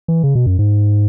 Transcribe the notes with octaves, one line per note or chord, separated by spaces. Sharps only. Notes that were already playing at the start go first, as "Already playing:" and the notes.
E3
C#3
B2
F#2
G#2